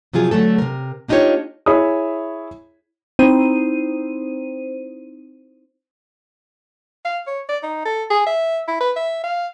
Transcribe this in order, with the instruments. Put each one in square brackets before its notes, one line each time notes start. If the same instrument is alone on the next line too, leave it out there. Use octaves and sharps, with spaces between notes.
[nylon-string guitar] C3 F3 F#3 F4 G#4
D3 F#3 A3 A4
C3 A#4
A#3 D4 D#4 F4 G4 C#5
[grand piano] E4 G#4 C#5 E5 B5 D#6
[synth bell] C4 D#4 E4 C5 D#7
[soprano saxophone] F5
C#5
D5
D#4
A4
G#4
E5
E4
B4
E5
F5